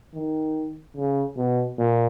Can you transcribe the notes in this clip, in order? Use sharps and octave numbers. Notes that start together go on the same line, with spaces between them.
D#3
C#3
B2
A#2